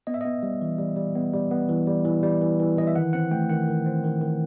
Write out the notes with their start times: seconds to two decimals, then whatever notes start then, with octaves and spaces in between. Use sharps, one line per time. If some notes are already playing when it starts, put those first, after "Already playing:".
0.07 B3 D#5
0.14 E5
0.21 B3 D#5
0.43 G3
0.61 E3
0.79 G3
0.96 G3
1.16 B3
1.34 G3
1.51 B3
1.69 E3
1.87 G3
2.05 E3
2.23 G3
2.41 E3
2.60 E3
2.77 E3 D#5
2.87 E5
2.96 D#3 F#5
3.13 C4 F#5
3.31 A3 G5
3.49 D#3 F#5
3.68 D#3
3.86 C4
4.04 D#3
4.22 D#3